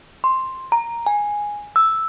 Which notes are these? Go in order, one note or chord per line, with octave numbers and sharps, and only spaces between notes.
C6
A#5
G#5
E6